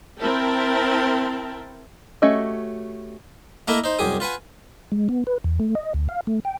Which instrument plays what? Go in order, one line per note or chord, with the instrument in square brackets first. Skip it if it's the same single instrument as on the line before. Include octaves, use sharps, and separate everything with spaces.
[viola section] C4 E4 A#4 G5 A5
[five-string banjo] A3 C#4 F#4 G4 D#5
[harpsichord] A3 A#3 E4 A#4 D#5 E5
D#4 C5
C2 F#2 G4 G#4 D#6
F4 B4 F#5 G#5
[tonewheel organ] G#3
B3
B4
E2
A3
D#5
D2
F5
A3
G5